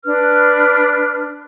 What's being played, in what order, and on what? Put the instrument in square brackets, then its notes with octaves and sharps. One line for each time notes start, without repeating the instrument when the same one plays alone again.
[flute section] D4 B4 F6